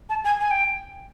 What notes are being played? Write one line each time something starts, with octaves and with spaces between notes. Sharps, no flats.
A5
G#5
G#5
G5